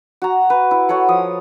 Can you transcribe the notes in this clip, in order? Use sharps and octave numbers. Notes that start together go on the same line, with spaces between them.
F#4 A#5
B4
E4
F#4 A4 C#5 F#5
F3 D#6